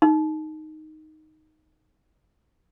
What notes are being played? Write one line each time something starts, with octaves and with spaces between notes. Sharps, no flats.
D#4